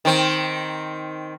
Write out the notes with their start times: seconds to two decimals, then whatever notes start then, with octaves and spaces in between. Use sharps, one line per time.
0.05 D#3 C4